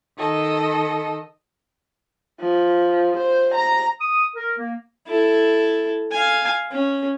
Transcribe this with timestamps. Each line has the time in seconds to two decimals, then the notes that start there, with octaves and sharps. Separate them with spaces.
0.17 D#3 A4 D#5
2.41 F3
3.18 C5
3.55 A#5
3.99 D#6
4.35 A#4
4.58 A#3
5.07 E4 A4
6.12 F5 G#5
6.71 C#4